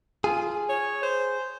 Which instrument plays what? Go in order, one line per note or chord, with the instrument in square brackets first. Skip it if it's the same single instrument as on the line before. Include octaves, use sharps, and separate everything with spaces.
[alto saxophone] F4 [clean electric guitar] G#4
[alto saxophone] C#5
C5